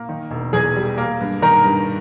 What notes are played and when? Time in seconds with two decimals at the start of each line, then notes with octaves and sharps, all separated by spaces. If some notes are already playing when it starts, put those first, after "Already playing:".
Already playing: A#3
0.09 D#3
0.31 E1
0.53 E2 G#4 G#5
0.76 G3
0.98 A#3
1.20 G2
1.42 D#3 A#4 A#5
1.64 G2